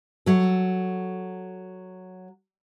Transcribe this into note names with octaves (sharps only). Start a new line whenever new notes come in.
F#3 A4